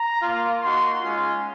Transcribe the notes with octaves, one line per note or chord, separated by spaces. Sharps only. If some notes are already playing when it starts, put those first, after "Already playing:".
Already playing: A#5
A#3 F4
A#3 D#4 F#4 C6
G#3 C#4 F4